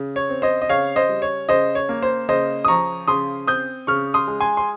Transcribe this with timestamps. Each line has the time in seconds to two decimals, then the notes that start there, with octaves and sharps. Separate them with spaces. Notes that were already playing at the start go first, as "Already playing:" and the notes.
Already playing: C#3
0.16 C#5
0.29 C4
0.42 C5 D#5
0.62 D#5
0.69 C#3 C#5 F5
0.96 C5 D#5
1.09 G3
1.22 C#5
1.49 C#3 C5 D#5
1.75 C#5
1.89 A#3
2.03 C5
2.28 C#3 C5 D#5
2.65 D#6
2.68 F3 A#5 C#6
3.08 C#3 C6 D#6
3.47 C4 D#6 G6
3.87 C#3 C#6 F6
4.14 C6 D#6
4.28 G#3
4.40 G#5 C6
4.57 C6